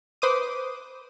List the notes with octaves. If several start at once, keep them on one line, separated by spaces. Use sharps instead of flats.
B4 C5 D6 D#6